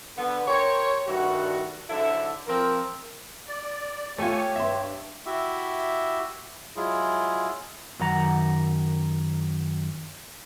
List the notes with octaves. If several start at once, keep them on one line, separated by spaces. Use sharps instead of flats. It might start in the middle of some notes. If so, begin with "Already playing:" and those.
D3 B3
G4 A#4 C5 C#5
G2 D#3 G3 A3 F#4
G#2 D3 F#3 E4 A4 E5
F3 C4 A#4
D5
A3 F4 G4 C#5 G#5 C#6
G2 E5 C6
E4 F#4 G4 E5
F#3 G#3 E4 F4 G#4
F#2 D#3 F#5 A#5